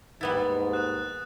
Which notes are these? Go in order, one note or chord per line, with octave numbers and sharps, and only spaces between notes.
D#2 G#2 G3 B3 E4 A6
D#6 F#6 E7